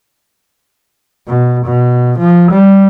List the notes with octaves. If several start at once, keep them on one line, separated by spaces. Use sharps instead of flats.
B2
B2
F3
G3